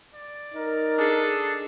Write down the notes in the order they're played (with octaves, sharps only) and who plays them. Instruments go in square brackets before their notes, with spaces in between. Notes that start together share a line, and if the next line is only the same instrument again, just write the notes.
[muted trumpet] D5
[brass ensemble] D#4 A#4
[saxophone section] D4 G#4 [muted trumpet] A4